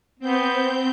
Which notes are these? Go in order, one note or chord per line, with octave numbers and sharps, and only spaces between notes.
B3 C4 G6